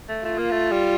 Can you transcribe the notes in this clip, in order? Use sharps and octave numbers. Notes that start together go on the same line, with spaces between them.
A3
A3 F4
A#3
A3
G3